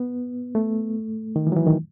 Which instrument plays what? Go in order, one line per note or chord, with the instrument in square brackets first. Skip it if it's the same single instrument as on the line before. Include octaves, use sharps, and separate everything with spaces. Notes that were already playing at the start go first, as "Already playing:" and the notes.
Already playing: [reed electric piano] B3
A3
D#3
E3
F#3
E3
D#3